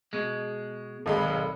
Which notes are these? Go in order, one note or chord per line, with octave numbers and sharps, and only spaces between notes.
B2 G#3
G#1 G#3 A4 F5 B5
B1